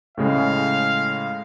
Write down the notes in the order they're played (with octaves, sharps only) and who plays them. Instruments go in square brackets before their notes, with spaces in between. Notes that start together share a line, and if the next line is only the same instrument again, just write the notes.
[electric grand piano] A2 C#3 G#3 [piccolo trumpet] F5